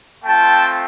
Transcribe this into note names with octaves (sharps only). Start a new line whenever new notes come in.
A3 C4 F4 G5 A5